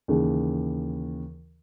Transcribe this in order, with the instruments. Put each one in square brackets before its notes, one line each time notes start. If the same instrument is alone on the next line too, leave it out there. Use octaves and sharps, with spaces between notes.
[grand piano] D#2 C#3 E3